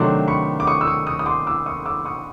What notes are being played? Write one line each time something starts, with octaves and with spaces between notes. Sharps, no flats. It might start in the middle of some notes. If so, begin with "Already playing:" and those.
Already playing: C3 D#3 F#3 A3 D4 C6 D6
B5 C#6
D6
C#6 D#6
E6
C#6 D#6
C#6 D#6
D#6
C6 D6
D6 E6
C#6 D#6
D6 E6
C#6 D#6